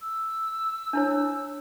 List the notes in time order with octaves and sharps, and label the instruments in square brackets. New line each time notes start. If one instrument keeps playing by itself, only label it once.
[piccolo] E6
[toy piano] D4 E4 C#5